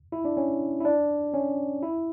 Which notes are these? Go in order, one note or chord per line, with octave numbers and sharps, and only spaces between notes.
E4
D4
C#4
E4
D4
C#4
E4